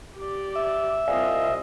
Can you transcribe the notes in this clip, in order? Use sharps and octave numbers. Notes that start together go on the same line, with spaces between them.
G4 D5
E5
C2 C4 F4 D5 D#5 F5 G#5